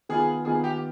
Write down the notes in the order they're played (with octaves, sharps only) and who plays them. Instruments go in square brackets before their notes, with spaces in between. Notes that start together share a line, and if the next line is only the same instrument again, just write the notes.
[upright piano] D#3 B3 F4 [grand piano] G#4
[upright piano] D#3 B3 F4 [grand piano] G#4
[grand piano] G4